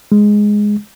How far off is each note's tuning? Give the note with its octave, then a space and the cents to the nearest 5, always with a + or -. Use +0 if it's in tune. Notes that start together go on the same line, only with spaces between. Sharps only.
G#3 +0